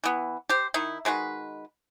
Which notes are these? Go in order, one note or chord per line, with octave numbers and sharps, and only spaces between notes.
E3 B3
G4 C5
D#3 D#4 E4
D#3 G#3 F#4 B4